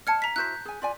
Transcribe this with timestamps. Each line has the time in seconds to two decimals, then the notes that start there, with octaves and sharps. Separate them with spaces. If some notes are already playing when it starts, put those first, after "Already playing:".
0.07 D#5 A5 F6 G#6 C#7
0.22 A#5 B6
0.36 E4 F#4 C5 F#6 G6 B6
0.65 G#4 G#5
0.82 F4 D5 G#5